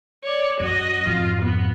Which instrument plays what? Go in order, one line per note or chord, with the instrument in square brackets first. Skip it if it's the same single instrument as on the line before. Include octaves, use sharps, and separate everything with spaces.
[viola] C#5 D5
[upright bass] F#2 [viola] F#4 D#5
[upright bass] F2 G#2 [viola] F4
[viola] B3